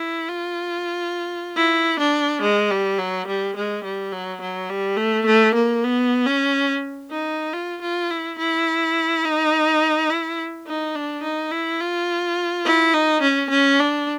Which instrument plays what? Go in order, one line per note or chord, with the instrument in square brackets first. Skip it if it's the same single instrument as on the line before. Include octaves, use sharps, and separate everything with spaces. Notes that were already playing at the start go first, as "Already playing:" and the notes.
Already playing: [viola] E4
F4
E4
D4
G#3
G3
F#3
G3
G#3
G3
F#3
F#3
G3
A3
A3
A#3
B3
C#4
D#4
F4
F4
E4
E4
D#4
E4
D#4
D4
D#4
E4
F4
E4
D#4
C#4
C#4
D4